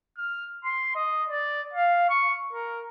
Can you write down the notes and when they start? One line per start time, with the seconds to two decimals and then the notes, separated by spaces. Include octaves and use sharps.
0.17 F6
0.64 C6
0.95 D#5
1.30 D5
1.73 F5
2.10 C#6
2.53 A#4